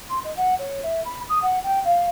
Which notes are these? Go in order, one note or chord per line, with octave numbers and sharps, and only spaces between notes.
C6
D#5
F#5
C#5
E5
B5
D#6
F#5
G5
F5